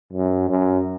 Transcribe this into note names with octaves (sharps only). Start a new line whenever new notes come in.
F#2
F#2